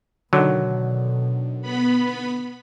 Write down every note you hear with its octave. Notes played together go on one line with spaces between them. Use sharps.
B2 D3 D#3 F#3
B3 B5